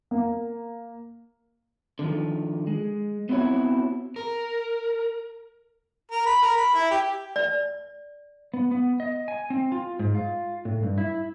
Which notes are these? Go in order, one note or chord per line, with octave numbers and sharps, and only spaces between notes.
A#3
D3 D#3 F3
G#3
B3 C4 E4 F#4 C#5
A#4
A#4
B5
A#4
B5
E4
G4
D5
B3
B3
D#5
G#5
C4
F4
G#2
F4
A2
G2
E4